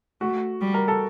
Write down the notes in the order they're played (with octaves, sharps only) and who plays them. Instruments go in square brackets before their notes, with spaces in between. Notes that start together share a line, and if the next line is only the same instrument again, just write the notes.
[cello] A3 [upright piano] F#4
[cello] G3
[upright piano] A#4
A4